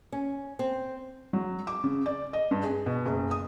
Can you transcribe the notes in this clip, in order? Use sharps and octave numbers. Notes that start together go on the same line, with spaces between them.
C#4
C4
F#3
D6
C#3
D5
D#5
G2
G#4
B2
F#1
D#6